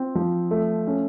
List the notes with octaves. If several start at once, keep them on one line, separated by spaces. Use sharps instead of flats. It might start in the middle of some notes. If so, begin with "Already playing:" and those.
Already playing: C4 F4
F3
A3
C#4